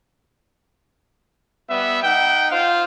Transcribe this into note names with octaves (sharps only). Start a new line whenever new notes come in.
G3 B3 E5
D#4 F#5 G5
F4 C5 F5